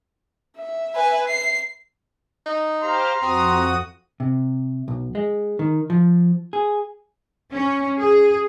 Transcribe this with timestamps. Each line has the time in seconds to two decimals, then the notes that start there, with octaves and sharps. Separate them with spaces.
0.57 E5
0.95 B4 G#5
1.28 C7
2.46 D#4
2.82 G4 C5 F5 A#5 C6
3.22 F2 C4 F#4 D#6
4.20 C3
4.88 B1
5.15 G#3
5.59 D#3
5.90 F3
6.53 G#4
7.53 C#4
7.99 G#4